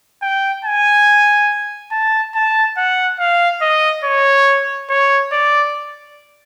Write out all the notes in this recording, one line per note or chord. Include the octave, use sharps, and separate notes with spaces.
G5
G#5
A5
A5
F#5
F5
D#5
C#5
C#5
D5